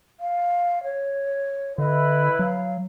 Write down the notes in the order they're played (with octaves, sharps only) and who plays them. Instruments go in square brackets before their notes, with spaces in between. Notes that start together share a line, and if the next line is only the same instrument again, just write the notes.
[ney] F5
C#5
[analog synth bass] D3 [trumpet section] E4 B4 [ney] D#5
[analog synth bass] F#3 [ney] F5